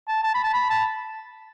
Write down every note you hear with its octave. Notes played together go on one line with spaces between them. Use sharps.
A5
A5
B5
A5
B5
A5